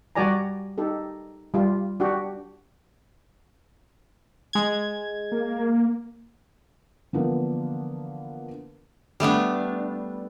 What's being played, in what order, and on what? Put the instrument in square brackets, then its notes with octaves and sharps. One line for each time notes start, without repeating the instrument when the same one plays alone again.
[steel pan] G3 F#4 G4 D5 G#5 A#5
D#4 G4 A4
G3 F4 G4
D4 F#4 G4
[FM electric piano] G#3 G#6
[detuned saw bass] A#3
[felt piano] D3 E3 F3 A#3 B3 D4
[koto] G3 A3 B3 D4